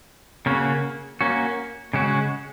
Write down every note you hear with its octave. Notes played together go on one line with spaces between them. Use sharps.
C#3 A#3 C#4 F#4
A#3 C#4 F#4
C#3 G#3 C#4 F#4